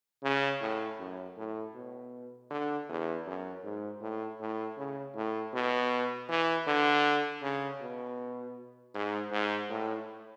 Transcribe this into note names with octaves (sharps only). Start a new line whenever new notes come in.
C#3
A2
F#2
A2
B2
D3
E2
F#2
G#2
A2
A2
C#3
A2
B2
E3
D3
C#3
B2
G#2
G#2
A2